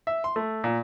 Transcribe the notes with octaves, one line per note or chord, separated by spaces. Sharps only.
E5
C6
A3
A#2